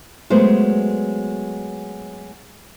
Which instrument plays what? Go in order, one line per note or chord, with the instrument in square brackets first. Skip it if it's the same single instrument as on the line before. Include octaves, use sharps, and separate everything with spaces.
[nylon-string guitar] F#3 G#3 A3 B3 C5